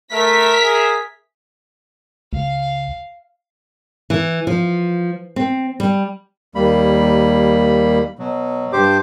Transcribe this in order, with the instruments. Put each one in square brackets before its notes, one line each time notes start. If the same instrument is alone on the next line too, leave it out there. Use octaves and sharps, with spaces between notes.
[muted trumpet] A3 [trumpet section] A#4 E5 [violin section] B6
[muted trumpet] G#4
[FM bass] C#2 [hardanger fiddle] F5
[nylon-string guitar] E3
F3
C4
G3
[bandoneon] D#2 G3 A#3 B5
B2 F#3
G2 G4 C5 D6